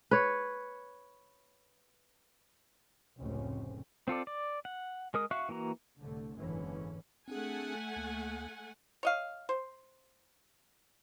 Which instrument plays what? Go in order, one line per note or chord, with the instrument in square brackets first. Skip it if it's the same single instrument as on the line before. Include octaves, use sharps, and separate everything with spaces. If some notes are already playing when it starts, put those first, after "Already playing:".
[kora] B4 C#5
[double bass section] F1 C#2 A2 C4 C#4
[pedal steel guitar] C4 F4 A4 D5
D5
F#5
G#3 A#4 D#6
F#4 E5 F5 C#6 F#6
E3 A#3 F#4 A#5
[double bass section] C2 A2 D3 A3
F#1 E2 G#2 D3 E3 C#4
[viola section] A3 F#5 G#5 [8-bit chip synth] C4 D4 G#4
[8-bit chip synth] D2 A#3
[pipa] C#5 D#5 F5
C5